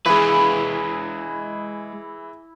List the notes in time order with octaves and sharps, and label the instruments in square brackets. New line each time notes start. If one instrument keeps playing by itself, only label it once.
[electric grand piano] E3 G#4 [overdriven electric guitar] G#3 B4 [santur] E4